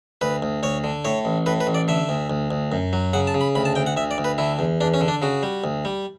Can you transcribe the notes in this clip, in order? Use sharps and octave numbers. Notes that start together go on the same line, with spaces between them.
D2 B4
D2
D2 C#5
D3
A2 C#5
A1
A2 B4
B4
A1
D5
D3 E5
D2
D2
D2
F#2
F#3
C#3 F#5
A5
C#3
B5
D2 B5
A5
D2 G5
F#5
D2 E5
D5
D2
B4
D3 E4
E2
E2 D4
C#4
D3
D4
C#3 F#4
G3
D2
G3